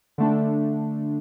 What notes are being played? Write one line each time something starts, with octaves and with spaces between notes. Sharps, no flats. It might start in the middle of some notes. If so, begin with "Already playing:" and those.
D3 A3 D4